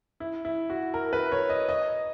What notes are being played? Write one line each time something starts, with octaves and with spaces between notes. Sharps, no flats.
E4
E4
F#4
A#4
B4
C#5
D#5
D#5